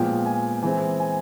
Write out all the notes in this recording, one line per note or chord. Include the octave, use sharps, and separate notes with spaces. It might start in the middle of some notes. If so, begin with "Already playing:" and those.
Already playing: A#2 F3 G#3 B3 G5
G#5
E3 G#3 C4 G#5
G#5